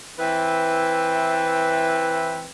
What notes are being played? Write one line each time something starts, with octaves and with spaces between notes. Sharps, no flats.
E3 C4 E4 B4